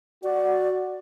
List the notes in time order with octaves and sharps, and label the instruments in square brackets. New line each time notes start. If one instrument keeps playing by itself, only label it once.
[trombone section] F#4 [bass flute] D5